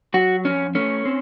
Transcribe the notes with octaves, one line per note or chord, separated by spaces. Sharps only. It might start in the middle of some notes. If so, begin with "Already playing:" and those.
F#3 F#4
F2 C#4
A3 C#4
C4